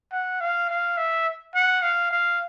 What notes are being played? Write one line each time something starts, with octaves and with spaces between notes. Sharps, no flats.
F#5
F5
F5
E5
F#5
F5
F5